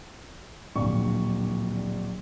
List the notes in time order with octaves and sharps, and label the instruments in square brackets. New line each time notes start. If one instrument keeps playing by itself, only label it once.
[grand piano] D1 A#1 A#2 D5 C#6